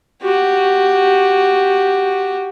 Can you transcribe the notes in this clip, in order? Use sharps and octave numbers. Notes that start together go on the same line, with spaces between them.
F#4 G4